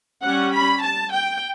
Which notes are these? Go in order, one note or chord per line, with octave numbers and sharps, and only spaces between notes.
G3 C#4 F#5
B5
A5
G5